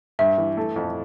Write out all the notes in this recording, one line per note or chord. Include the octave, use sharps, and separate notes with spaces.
G2 E5
E3
A3
F2